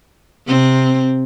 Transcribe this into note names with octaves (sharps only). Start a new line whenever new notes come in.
C3 C4